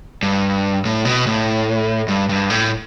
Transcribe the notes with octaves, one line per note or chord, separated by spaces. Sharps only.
G2
A2
B2
A2
G2
G2
A2